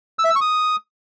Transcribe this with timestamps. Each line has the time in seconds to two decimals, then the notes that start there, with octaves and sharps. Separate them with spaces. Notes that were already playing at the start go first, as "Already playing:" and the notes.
0.19 E6
0.24 E5
0.30 E6
0.36 C#6
0.41 D#6